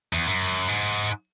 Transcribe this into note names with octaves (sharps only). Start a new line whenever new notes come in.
E2
F#2
G#2